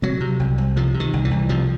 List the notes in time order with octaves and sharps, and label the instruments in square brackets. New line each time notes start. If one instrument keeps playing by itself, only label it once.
[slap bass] C3 F#3
C3
C2
C2
C3 F3
C3
D#3
C2
E3
C2
C3 F3